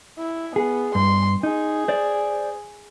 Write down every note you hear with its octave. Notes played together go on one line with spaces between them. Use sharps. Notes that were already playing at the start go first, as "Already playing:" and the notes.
E4
B3 G#4
G2 C6
D#4 G#4
C5 D5